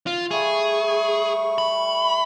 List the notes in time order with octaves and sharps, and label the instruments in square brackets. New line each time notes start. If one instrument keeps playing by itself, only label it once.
[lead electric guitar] F4
[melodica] G3 A3 C#6 [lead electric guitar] G#4
[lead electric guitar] B5